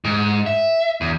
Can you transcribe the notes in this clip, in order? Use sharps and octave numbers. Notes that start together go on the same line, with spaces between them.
G#2
E5
E2